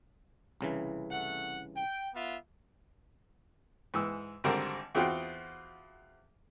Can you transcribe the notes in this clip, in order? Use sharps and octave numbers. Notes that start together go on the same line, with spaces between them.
C2 C#3 E3
A3 F#5
G5
B3 F4 E5
G#2 E3 E6
G#1 D3 G3 C4 A#4
E2 C4 F4 F#4 G5